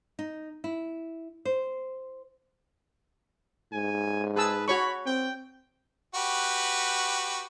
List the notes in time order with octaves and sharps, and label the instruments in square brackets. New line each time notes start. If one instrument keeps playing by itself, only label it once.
[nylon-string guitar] D#4
E4
C5
[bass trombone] G#2 [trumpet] G#5
[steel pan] G#4 A5 E6 [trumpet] B4
[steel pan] F#4 C#5 C#6 [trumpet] B5
[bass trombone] C4 [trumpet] G5
[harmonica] F#4 G4 B4